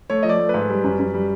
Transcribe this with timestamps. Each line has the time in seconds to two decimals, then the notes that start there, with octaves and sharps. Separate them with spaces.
0.10 A3 C#5
0.23 F3 D#5
0.29 D5
0.39 A3
0.49 G#2 B4
0.69 G3
0.84 F#2
0.99 F#2
1.14 G3